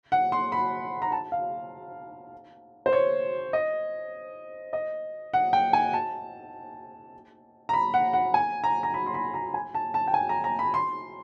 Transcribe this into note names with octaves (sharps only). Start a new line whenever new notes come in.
F#5
C6
B5
A#5
A5
F5
C5
C#5
D#5
D#5
F#5
G5
G#5
A5
A#5
B5
F#5
F#5
G#5
A#5
A#5
B5
C6
B5
A#5
G#5
A5
A5
G5
G#5
A#5
A#5
B5
C6